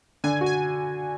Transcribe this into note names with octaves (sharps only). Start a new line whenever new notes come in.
D3 G#5
F#4
G#5